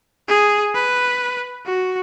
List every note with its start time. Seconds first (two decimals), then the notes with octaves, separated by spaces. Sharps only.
0.29 G#4
0.74 B4
1.66 F#4